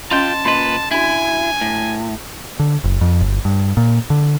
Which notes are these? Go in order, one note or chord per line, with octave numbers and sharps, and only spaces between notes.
C#4 F4 D#5 G5 A5 C6
A#2 B4 D#5 C6
D4 E4 F#4 G#5
A2
D3
F#1
F2
G1
G2
A#2
D3